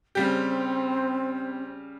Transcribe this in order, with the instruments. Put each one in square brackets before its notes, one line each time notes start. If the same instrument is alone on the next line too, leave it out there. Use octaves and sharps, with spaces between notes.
[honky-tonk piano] C#3 G3 G4 [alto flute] C4